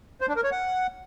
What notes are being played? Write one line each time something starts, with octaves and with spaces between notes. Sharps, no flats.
C5
D4
A#4
C#5
F#5